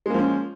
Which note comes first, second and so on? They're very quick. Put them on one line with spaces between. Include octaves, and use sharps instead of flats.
G#3 A#3 F3 C#4